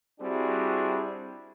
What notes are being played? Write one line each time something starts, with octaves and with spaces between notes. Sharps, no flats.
G3 C4 D4 E4 F#4 G#4